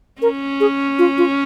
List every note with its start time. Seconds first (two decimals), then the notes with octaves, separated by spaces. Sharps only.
0.22 C#4 A#4
0.60 G#4
0.99 F4
1.18 F4